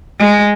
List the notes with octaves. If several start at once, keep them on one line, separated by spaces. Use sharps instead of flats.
G#3